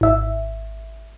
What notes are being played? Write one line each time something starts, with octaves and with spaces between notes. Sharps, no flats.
G#1 E5